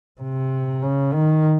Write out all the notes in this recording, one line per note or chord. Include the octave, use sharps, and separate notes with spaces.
C3
C#3
D#3